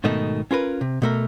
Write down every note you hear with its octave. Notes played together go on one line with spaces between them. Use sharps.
G#2 B2 D#3 A3 D#4
C#4 F4 A#4 B4
C3
B2 A3 A#4